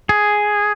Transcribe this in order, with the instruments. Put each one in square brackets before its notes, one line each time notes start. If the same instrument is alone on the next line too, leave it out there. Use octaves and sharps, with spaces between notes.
[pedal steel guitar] G#4